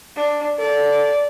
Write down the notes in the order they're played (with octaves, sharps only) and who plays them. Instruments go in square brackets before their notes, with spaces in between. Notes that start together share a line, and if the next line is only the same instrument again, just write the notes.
[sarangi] D4
[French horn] A4 [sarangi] D5